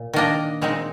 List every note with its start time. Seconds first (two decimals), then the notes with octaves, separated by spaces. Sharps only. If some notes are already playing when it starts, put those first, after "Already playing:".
Already playing: A#2
0.13 D#3 A#3 D4 D#5
0.61 A#2 G#3 C4 D#4